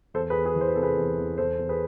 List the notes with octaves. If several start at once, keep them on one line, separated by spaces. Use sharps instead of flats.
E2 A4 C5
G#4 B4
E2
G#4 B4
E3
C5
B4
C3 A4
G#4 B4
E2
E2
E2 A4 C5
E2
G#4 B4